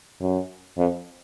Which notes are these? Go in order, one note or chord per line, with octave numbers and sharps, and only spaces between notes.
F#2
F2